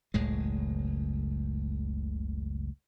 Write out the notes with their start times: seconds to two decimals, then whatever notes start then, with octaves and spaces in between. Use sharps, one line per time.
0.14 F#1 C#2 A2 G#3